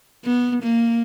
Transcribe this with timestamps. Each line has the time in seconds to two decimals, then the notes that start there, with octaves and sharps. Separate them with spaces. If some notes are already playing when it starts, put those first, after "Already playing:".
0.25 B3
0.63 A#3